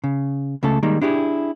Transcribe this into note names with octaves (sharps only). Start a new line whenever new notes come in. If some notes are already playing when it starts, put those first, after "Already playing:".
C#3
C#2 C#3 A3 A4
D#3 G3 G#3 A#3
D4 E4 G4 G#4